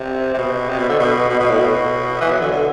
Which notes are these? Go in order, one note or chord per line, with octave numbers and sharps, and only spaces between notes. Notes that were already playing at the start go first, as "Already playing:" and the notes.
Already playing: C3
C3
B2
C3
B2
D3
B2
B2
B2
A2
B2
E3
F#3
D3
D3